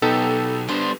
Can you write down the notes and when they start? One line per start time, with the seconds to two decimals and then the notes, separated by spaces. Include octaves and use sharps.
0.02 B1 B3 D#4 G4 A4
0.68 G3 B3 D4 C5